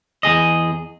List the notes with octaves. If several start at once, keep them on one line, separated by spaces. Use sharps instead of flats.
E2 G#4 D#5